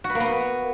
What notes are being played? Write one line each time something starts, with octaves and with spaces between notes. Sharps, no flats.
F#4
B4
A#3
B3
F#4